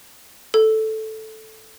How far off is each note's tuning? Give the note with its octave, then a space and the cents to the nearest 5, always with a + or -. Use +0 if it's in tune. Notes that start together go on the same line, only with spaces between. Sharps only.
A4 -5